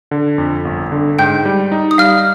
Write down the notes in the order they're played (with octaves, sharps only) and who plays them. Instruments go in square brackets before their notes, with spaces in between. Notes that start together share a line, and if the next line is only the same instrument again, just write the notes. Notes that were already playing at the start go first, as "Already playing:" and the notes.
[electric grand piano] D3
F2
G1
D3
[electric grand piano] G#2 [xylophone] G5 G6
[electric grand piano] G3
D#4
[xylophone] D#6
[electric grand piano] G3 [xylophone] F5 F6